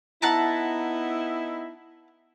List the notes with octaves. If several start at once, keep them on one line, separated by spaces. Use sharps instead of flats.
B3 D#4 E4 F#5 A5 A#5